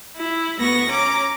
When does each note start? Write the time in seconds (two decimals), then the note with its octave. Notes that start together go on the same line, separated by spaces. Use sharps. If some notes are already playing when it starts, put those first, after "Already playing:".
0.17 E4
0.59 D2 B3 C#6 A#6
0.88 C#4 A#5 D6